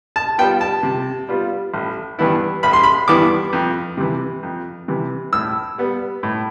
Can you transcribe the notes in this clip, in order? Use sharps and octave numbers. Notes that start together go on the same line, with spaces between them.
A5
G3 B3 F4 G5
A5
C3
G3 B3 F4
A1
G2 E3 B3 E4
A1 B5
C6
B5
G2 E3 B3 E4 D6
F2
C3 E3
F2
C3 E3
A2 E6
G3 B3
A2